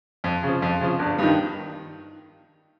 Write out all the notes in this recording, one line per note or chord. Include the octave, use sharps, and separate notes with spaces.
F2
C#3 F3
F2
C#3 F3
G1
G2 D#3